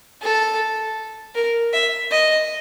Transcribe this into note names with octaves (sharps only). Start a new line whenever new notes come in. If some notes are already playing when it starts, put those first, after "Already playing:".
A4
A#4
E5
D#5